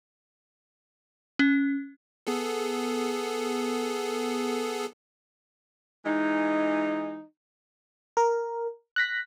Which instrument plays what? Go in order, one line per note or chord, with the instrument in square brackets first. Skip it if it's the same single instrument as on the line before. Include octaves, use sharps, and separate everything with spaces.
[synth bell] C#4
[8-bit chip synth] B3 G#4 A4
[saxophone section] E3 G#3 D#4
[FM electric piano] A#4
F#6 A#6 B6